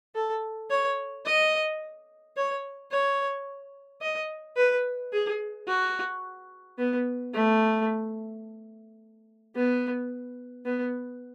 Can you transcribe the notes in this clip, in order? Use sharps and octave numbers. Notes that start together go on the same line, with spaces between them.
A4
C#5
D#5
C#5
C#5
D#5
B4
G#4
F#4
B3
A3
B3
B3